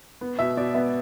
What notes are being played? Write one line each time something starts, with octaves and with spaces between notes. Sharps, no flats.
B3
B2 E5
B2 D5
B3 E5